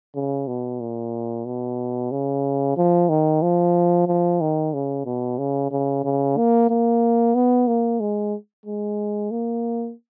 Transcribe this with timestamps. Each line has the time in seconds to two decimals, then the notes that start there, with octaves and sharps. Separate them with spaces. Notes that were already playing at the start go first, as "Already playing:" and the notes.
0.15 C#3
0.48 B2
0.80 A#2
1.46 B2
2.11 C#3
2.77 F3
3.09 D#3
3.42 F3
4.07 F3
4.41 D#3
4.73 C#3
5.06 B2
5.38 C#3
5.71 C#3
6.04 C#3
6.37 A#3
6.70 A#3
7.35 B3
7.68 A#3
8.00 G#3
8.66 G#3
9.31 A#3